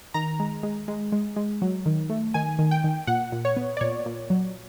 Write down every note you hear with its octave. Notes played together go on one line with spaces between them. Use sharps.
D#3 A#5
G#3
G#3
G#3
G#3
G#3
F#3
D#3
A3
D#3 G#5
D#3
G5
D#3
A#2 F#5
A#2
C#5
B3
D5
A#2 C#5
A#2
F#3